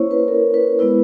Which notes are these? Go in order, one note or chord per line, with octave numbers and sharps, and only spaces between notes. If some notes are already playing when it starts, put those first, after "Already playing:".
Already playing: A#3 C#4 E4 C5 C#5
B4
A#4
B4
G#3 B3 E4 B4